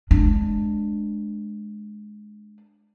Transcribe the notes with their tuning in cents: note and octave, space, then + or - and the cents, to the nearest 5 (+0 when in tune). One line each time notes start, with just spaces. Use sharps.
G#3 +15 D4 +15